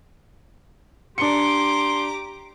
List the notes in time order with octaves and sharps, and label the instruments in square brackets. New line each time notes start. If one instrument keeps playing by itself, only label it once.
[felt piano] D4 C#7 [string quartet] G4 A#5 D6 [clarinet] C6